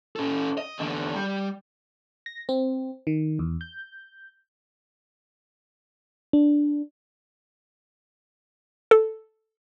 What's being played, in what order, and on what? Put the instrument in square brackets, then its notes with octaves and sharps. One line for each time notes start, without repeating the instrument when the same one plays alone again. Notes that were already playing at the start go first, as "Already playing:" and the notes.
[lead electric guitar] C#4 A4
D#5
E2 D3
G3
[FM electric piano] A#6
C4
D#3
E2
G6
D4
[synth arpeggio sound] A4